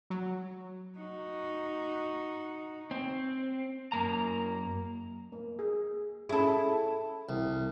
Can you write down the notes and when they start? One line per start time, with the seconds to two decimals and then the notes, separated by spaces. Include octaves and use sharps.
0.10 F#3
0.99 D#4 F#4
2.91 C4
3.92 F#2 A#3 A#5
5.32 A#3
5.59 G#4
6.29 C#4 E4 G#4 A4
7.29 C2